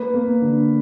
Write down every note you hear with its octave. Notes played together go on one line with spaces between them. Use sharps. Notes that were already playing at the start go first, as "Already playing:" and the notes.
Already playing: A#3 B4
A#3
D3